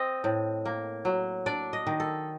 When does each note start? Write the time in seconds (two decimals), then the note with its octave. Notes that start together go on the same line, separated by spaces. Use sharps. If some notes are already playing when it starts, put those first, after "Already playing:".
Already playing: C4 D#5
0.24 A2
0.65 A#3
1.05 F#3
1.46 D4 D5
1.73 D#5
1.87 D#3
2.00 A4